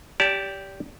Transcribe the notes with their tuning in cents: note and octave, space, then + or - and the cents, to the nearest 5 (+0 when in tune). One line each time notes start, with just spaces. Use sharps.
G4 +0 D5 -35 A5 +5